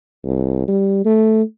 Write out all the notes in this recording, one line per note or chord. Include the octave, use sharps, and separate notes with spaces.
C2
G3
A3